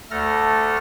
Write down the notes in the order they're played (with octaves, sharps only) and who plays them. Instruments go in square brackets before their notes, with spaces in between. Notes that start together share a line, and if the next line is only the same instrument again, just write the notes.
[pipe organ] D2 A3 A4 F6 A#6